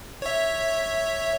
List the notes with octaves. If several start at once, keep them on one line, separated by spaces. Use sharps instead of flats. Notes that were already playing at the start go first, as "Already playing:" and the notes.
C#5 E5